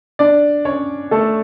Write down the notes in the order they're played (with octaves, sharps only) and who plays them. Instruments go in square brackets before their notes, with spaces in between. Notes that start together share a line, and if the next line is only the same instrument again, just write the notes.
[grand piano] D4 D5
C#4 C#5
A3 A4